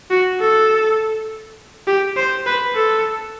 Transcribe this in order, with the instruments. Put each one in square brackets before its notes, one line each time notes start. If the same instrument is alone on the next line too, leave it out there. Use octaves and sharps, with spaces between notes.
[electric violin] F#4
A4
G4
C5
B4
A4